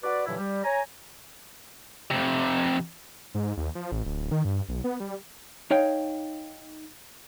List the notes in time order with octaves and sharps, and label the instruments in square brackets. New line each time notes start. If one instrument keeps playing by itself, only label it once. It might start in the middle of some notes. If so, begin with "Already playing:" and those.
[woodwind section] F#4 B4 D5
G2 A#2 D3 E3 F#3 E4
G3
C#5 G#5 A#5
[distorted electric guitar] F2 C3
[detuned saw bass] G#2
D#2
F3
A1
D1
D#3
G2
B1
B3
G3
[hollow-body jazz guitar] D#4 C#5 F5 G5